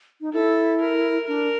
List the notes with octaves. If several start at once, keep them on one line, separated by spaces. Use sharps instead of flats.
D#4
E4 A4
A#4
D4 A#4